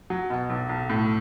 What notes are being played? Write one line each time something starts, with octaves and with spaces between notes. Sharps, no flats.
F#3
B2
B1
B1
A2